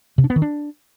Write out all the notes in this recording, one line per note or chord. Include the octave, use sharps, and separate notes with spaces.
C3
D4
B3
D#3
D4